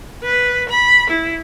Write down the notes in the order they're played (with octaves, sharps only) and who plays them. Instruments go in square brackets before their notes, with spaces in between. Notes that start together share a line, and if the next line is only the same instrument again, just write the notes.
[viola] B4
B5
E4